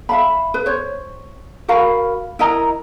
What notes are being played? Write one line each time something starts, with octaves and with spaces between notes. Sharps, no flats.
E5 F5 B5
B4
C5 C#5
F#4 A#4 F5 B5
E4 A#4 D#5 A#5